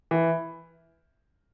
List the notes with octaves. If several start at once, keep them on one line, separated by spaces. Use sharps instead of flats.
E3